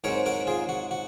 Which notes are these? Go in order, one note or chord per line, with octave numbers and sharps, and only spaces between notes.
G#2 F#3 C4 A#4 C#5
F#4 A#4
F4 G#4
F#4
F#4